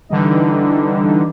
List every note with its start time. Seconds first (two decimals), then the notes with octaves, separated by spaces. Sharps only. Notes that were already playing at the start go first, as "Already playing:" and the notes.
0.09 D3 E3 G3 D#4